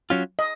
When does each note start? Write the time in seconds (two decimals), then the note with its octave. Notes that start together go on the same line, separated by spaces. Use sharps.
0.10 F#3 C#4 F4
0.39 D#5